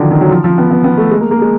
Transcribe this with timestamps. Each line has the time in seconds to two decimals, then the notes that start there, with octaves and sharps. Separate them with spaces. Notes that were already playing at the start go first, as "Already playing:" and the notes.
Already playing: D3 D#3 F3 F#3
0.11 D#3
0.21 F#3
0.31 F3
0.44 F3
0.58 B3
0.71 B3
0.84 B3
0.97 A3
1.11 G#3
1.21 A#3
1.31 A#3
1.41 G#3